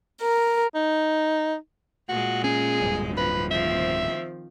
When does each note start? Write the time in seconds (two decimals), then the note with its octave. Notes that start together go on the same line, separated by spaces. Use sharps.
0.21 A#4
0.75 D#4
2.09 A#2 G#3 F#4
2.44 C#4 G#4
2.81 D1 G2
3.17 F3 B4
3.51 D#3 F3 C4 E5